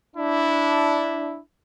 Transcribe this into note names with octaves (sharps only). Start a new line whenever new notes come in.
D4 E4